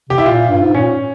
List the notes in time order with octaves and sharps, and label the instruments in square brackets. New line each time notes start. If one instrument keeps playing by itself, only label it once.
[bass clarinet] C3 [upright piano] G4
[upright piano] E4
[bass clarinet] A#2 [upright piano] F4
[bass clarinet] G2
G#2
[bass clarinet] A#2 [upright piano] C#4